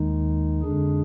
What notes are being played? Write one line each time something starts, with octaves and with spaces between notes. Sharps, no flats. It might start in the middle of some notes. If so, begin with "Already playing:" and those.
Already playing: D#2 D#3 G#3 D#4
F2 D3 G#3 D4 G#4